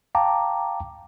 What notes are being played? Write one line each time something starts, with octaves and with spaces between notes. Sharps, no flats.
F5 G5 A5 A#5 D6